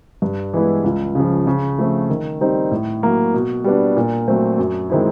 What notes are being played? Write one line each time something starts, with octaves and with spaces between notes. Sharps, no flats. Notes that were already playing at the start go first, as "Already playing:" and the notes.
G2
E3 G#3 B3 E4
C#2
C#3 F3
C#3
F3 A3 C4
D#3
G3 C4 D#4
A2
F#3 A#3
B2
G3 B3 D4
A#2
F#3 A3 C4
F#2
D#3 G#3 C4 E4